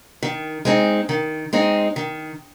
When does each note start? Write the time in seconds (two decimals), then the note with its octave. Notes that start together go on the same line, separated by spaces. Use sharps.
0.23 D#3
0.65 G#3 C4 D#4
1.09 D#3
1.53 G#3 C4 D#4
1.96 D#3